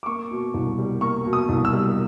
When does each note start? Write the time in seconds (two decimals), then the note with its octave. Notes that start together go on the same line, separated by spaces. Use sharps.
0.03 D6
0.06 A#3 C#6
0.31 B2
0.54 C2
0.78 G3
1.01 A#3 C#6
1.26 B2
1.33 D#6
1.49 C2
1.65 E6
1.73 G3